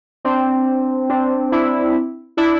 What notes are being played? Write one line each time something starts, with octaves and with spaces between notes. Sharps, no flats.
C4 D4
C4 D4
D4 E4
D4 E4